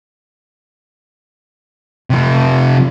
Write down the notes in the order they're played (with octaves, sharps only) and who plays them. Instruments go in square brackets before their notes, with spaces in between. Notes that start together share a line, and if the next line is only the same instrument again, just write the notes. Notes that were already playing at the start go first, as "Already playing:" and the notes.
[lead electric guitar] C3 F3